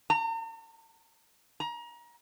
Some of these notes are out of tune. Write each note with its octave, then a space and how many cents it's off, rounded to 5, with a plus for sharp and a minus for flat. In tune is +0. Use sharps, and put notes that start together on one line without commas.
A#5 -45
A#5 +30